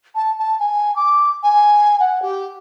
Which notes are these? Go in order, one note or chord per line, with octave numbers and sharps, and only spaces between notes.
A5
A5
G#5
D6
G#5
F#5
G4